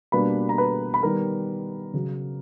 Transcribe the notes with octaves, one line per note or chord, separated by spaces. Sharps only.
B2 G3 A#3 D4 B4 B5
A#5
B4 B5
B5
D#3 G3 B3 A#4 A#5
C#3 F#3